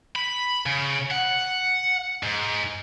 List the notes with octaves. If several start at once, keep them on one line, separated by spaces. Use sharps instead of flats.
B5
C#3
F#5
G#2